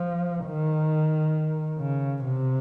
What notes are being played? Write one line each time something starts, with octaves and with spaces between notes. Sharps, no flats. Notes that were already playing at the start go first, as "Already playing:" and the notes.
Already playing: F3
D#3
C#3
C3